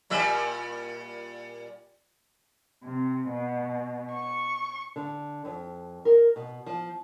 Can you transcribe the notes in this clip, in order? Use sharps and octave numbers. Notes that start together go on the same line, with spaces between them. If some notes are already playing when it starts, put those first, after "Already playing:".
A#2 G3 E5
C3
B2
C#6
D3
F2
A#4
B2
F3